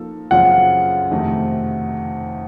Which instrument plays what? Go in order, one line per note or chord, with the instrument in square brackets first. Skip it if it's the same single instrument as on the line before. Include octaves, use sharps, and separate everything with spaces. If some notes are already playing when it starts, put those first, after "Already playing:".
Already playing: [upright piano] F3 A#3 D#4 A4
[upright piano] F#2 C#3 F3 C4 F4 [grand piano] F#5
[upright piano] F2 C3 D#3 A3 D#4